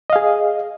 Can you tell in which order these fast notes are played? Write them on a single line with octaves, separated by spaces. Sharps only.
D#5 F5 G#4